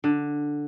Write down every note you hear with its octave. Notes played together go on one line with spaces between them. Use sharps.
D3